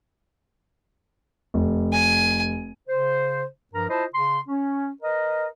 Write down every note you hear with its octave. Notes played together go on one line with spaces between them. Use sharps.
F1
G#5
C#3 C5
G2 F3 A#4 A#5
E4 F4 C5 D#5 A5
C#3 C6
C#4
A#4 B4 D#5